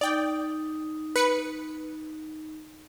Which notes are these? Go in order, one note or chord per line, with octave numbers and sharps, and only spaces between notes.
D#4 D5 G5
B4 C#7